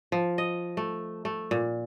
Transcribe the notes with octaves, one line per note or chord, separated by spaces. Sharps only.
F3
D#5
A3
A3
A#2